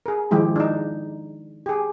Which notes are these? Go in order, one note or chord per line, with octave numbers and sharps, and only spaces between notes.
G#4 A#4
D#3 F3 G#3 E4 G4
D4 D#4
G4 G#4